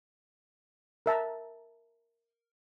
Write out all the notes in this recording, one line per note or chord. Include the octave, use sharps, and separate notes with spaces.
A#4 E5 A5 A#5